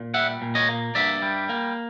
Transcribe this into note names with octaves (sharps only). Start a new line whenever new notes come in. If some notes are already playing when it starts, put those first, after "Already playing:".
Already playing: A#2
G3 E5 F#5
A#2
C#5 D#5
A#3
G2 D5 E5
G3
A#3